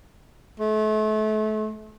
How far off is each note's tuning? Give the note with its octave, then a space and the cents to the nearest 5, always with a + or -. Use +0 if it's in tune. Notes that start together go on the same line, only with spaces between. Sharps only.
A3 -35